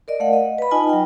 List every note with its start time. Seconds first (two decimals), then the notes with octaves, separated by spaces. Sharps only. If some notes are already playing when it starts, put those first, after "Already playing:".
0.08 A#4 D5 D#5
0.20 A3 F5 F#5
0.33 D#5
0.58 B4 B5
0.71 D#4 F4 D#5 G#5 A5
0.89 F#3 G5